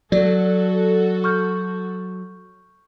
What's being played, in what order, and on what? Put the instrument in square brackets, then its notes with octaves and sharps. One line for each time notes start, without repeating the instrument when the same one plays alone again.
[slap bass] F#3 [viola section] F#4 A4 [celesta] D5
[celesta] C#6 F6 G6